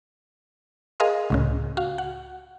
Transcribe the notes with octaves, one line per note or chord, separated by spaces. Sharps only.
G#4 A#4 D#5 F5 C6
C#2 A2 C#3
F#4 F5
F#5